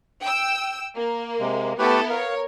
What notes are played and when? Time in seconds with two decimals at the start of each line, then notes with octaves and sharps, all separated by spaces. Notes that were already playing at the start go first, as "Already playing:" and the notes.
0.21 G5 E6
0.95 A#3
1.40 C3 G#3
1.79 A3 B3 E4 G4 A4 B4
2.10 A#4 C#5 F5